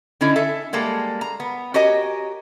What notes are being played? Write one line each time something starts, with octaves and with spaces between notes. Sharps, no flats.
D3 C#4 D#4 E4
A4 E5 G#5
G3 G#3 A#3 A4
A#5
B3
F#4 G4 A#4 C#5 D#5 G#5